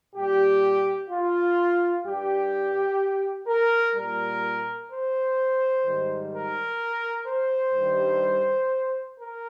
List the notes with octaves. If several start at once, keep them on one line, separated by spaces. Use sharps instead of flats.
A#2 G3 G4
F4
G2 G3 G4
A#4
A#2 G3 A#4
C5
G#2 D#3 G3
A#4
C5
G2 D#3 G3
A#4